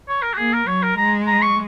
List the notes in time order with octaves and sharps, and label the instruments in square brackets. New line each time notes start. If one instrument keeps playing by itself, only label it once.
[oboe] C#5
A#4
F#4
[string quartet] A#3 [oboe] G#4
[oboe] A#4
[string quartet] F#3 [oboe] C#5
[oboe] A#4
[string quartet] G#3 [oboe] A#5
[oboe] A#5
C#6